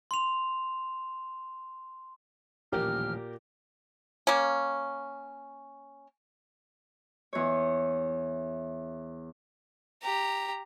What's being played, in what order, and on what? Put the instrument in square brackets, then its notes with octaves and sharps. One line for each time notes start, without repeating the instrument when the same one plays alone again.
[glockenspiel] C6 F7
[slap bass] D#1 A1 F3 [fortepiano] A#2 G4 A#4 [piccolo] F6
[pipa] A#3 C#4
[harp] E2 C#5
[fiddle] G4 A#5